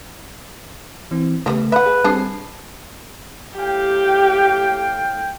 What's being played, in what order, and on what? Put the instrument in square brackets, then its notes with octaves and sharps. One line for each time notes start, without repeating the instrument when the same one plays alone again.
[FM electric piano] E3 C4
[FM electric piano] C#3 A3 [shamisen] F3 G3 B3
[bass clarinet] B4 [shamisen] E5 F#5
[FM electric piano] G#4
[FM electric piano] G3 C4 C7 [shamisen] D4 G#4 A4
[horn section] A2 F5 G5 [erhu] G4